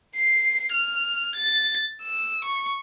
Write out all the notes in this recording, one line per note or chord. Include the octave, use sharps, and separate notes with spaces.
C7
F6
A6
E6
C#6